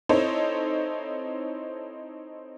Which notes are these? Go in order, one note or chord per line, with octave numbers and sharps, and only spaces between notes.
C4 D#4 E4 A4 C5 C#5